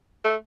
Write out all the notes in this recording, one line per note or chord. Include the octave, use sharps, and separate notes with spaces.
A3